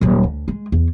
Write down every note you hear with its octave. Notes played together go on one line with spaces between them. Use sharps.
D#1 F#3
D2
G#3
E2